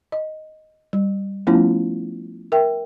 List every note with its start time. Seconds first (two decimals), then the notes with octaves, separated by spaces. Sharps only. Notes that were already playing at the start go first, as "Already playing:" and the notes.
0.12 D#5
0.93 G3
1.47 F3 A3 B3 C#4 E4 F4
2.52 A#4 E5 G5